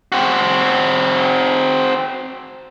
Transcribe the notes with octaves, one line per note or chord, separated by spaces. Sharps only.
C4 F#4